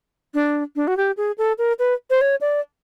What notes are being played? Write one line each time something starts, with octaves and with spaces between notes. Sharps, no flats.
D4
D4
F#4
G4
G#4
A4
A#4
B4
C5
C#5
D5